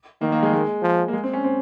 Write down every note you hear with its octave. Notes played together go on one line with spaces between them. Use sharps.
D#3 A#3
A#3
G#3
G#3
F3
A#3
G#3
C4
C#4
C4